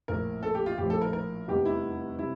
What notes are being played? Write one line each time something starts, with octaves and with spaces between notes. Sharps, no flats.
A#1 A2 F3 A#3 A#4
A4
G4
F4
A#1 A2 F3 G4
A4
A#4
A#4
F1 E2 C3 G3 G4
E4
C3 G3 E4